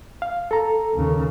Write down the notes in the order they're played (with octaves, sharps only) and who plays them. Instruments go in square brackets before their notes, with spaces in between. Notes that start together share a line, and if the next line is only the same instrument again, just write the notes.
[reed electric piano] F5
A4 A#5
[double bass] D#2 C#3